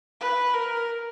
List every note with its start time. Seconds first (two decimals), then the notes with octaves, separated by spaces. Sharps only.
0.21 B4
0.54 A#4